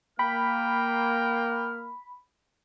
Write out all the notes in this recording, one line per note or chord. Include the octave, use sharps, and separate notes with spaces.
A#3 G5 B5 F6